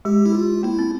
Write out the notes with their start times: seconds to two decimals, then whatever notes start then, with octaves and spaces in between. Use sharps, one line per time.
0.05 G#3 G4
0.26 E4
0.35 F4
0.63 A#3 E4
0.79 C4